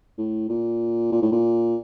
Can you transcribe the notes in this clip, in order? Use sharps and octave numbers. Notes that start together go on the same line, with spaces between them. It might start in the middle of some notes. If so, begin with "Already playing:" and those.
A2
A#2
A#2
A2
A#2